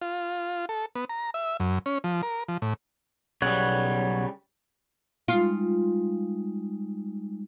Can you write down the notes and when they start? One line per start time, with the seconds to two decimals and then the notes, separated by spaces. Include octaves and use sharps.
0.02 F4
0.69 A4
0.96 B3
1.09 A#5
1.34 E5
1.60 F#2
1.86 C#4
2.04 F3
2.23 A#4
2.48 F3
2.62 A2
3.42 B1 C#3 G3 C#5 F#5
5.28 G3 G#3 D#4 F4